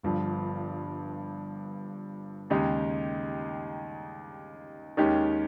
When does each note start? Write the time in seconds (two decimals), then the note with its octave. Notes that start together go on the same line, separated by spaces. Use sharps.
0.03 G1 G2 F3
2.50 D#2 C#3 G#3 D#4 G4
4.97 D#2 D#3 G#3 C#4 G4